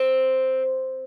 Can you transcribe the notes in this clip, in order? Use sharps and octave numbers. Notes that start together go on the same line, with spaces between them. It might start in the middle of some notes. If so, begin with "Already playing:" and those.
Already playing: C4